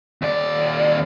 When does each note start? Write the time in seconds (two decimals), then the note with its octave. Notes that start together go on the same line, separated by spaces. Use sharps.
0.22 D#2 D5